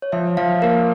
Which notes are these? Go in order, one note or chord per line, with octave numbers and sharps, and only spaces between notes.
C#5
F3 E5
F3 F5
A#3 A#4